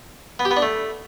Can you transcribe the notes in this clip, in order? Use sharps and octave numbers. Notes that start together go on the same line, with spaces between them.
B3
G4
B3
D4
A3